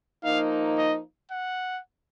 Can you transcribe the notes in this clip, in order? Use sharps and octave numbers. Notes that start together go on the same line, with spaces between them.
F3 A#3 D#4 F5
D#5
F#5